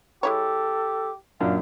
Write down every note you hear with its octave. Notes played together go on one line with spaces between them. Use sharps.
G#3 E4 G4 A4 C#5
F#2 A#2 D4 F5